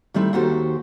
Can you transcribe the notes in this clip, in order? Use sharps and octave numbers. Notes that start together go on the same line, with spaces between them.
D#3 G3 A3 C4 E4
D#2 D#3 F#4 G4 A4 C5